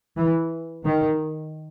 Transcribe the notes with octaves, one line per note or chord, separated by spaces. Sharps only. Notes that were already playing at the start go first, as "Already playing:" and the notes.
E3
D#3